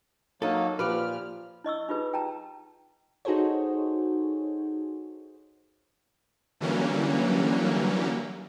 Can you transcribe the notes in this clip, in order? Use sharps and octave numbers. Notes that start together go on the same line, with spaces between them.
F#3 A#3 D#4 A4
A#2 F3 G4 B4 F6
E4 D#5 C#6 E6
D#4 F4 G4 G#4 B4
G5 A5 A#5
D#4 F#4 G#4 A4 C5 C#5
D3 E3 F#3 G3 A#3 C#4